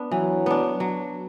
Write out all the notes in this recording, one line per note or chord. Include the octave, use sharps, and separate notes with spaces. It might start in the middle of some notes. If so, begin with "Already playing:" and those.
Already playing: B3 D4
E3 F#3
B3 D4
F#3